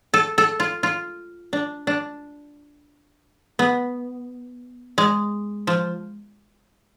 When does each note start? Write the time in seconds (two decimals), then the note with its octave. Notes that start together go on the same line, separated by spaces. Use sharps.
0.14 A4
0.38 A4
0.60 F4
0.83 F4
1.53 D4
1.87 D4
3.59 B3
4.98 G#3
5.67 F3